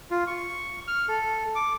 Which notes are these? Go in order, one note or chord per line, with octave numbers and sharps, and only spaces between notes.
F4
C#6
F6
A4
D6